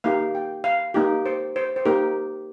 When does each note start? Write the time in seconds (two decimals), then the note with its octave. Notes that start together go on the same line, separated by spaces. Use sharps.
0.04 A#3 D#4 G4 F5
0.35 G5
0.64 F5
0.94 A#3 D#4 G4
1.26 C5
1.56 C5
1.76 C5
1.85 A#3 D#4 G4 A#4